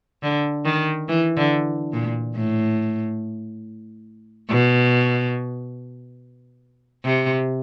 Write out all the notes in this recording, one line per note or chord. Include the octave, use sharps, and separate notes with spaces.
D3
D#3
E3
D3
A#2
A2
B2
C3